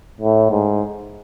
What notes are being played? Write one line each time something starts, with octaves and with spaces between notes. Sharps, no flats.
A2
G#2